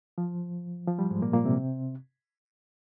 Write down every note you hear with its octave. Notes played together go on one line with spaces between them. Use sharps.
F3
F3
G3
G#2 G#3
A#2 A#3
A#2 A#3
C3 C4